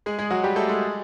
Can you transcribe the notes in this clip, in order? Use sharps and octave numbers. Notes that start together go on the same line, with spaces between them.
G#3 G#4
G#3 G#4
F#3 F#4
G3 G4
A3 A4
G#3 G#4